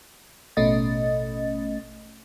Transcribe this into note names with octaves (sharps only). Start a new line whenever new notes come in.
A1 B2 A3 C#4 D#5 A6